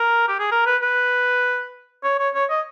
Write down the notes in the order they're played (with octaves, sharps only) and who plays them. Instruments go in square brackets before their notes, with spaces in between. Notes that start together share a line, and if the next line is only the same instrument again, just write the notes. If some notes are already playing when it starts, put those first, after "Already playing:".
Already playing: [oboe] A#4
G4
G#4
A#4
B4
B4
C#5
C#5
C#5
D#5